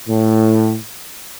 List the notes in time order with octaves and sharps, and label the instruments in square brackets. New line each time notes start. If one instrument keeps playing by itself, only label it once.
[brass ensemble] A2